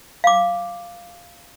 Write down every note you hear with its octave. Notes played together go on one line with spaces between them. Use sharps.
F5 D6